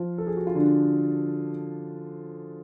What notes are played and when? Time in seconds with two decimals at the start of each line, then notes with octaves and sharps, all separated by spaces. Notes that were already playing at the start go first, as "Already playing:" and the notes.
Already playing: F3 F4
0.18 A4
0.27 G#4
0.37 F#4
0.47 F4
0.55 D3 D4